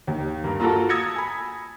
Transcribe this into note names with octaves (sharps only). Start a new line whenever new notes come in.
D#2
G2 A#3
A#3 F4 F#4 A4
D#6 E6 G#6 A#6 C#7
G#5 B5